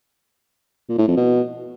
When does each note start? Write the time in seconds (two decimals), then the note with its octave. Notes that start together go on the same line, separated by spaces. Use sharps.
0.89 A#2
0.99 A2
1.08 F2
1.17 B2